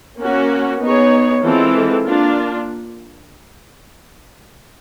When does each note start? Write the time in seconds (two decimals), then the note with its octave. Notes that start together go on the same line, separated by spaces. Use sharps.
0.20 A#3 C#4 F#4
0.82 B3 D#4 G#4 C#5
1.43 E3 G#3 C4 F4 A4
2.05 A#3 D4 F4